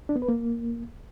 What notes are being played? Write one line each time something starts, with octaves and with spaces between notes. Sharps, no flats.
D4
B3
B4
A#3